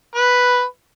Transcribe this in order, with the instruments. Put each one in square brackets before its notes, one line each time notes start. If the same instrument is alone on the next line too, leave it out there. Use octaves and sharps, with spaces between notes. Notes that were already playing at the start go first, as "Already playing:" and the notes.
[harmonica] B4